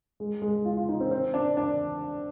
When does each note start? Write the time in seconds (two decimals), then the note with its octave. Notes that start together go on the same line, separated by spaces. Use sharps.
0.20 G#3
0.42 G#3
0.65 F4
0.77 F4
0.89 D#4
1.00 C4
1.11 C4
1.34 D4
1.57 D4